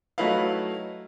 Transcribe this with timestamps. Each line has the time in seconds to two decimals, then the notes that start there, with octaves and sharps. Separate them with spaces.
0.18 F#3 A3 D#4 E4 B4 F5